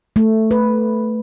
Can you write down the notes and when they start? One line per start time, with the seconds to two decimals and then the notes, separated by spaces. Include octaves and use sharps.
0.16 A3
0.51 B4